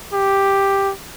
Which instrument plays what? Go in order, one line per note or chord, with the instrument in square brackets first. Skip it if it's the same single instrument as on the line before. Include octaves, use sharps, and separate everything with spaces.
[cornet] G4